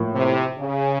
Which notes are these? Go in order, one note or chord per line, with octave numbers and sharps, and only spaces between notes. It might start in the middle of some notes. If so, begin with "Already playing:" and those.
Already playing: A2 F3 A#3
C3
C#3